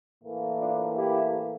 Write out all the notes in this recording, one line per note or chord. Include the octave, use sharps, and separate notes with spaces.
A2 E3 A#3
D4 F4
E4 G4